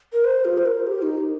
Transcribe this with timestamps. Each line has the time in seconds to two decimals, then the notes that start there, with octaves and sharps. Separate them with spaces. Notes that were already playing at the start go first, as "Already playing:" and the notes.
0.13 A#4
0.24 C5
0.45 F4
0.58 C5
0.66 A#4
0.87 G4
1.02 D#4